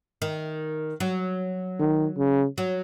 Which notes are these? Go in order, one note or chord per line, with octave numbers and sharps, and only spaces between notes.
D#3
F#3
D#3
C#3
F#3